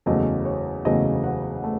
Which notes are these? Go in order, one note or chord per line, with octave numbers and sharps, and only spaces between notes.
F#1 E2 C#3 F#3 A3 D#5
C#5
F#1 E2 C#3 F#3 A3 D#5
F#5
A3